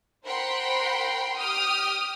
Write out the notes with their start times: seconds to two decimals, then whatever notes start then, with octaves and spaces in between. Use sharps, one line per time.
0.25 A#4 C5 F#5 G5 B5 C6
1.38 G4 G5 D#6 F6